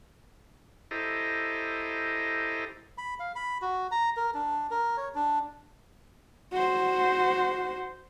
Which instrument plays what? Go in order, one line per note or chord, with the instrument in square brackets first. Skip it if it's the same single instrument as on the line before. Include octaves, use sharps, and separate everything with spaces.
[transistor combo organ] E4 G4 A4 C5 D#5 A#5
[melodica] B5
F5
B5
F#4
A#5
A#4
D4
A#4
C#5
D4
[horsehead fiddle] F#4 C5